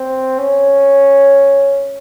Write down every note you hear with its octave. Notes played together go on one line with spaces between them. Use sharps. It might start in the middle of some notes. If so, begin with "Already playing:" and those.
Already playing: C4
C#4